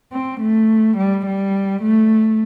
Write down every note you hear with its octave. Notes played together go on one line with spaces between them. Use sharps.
C4
A3
G3
G3
A3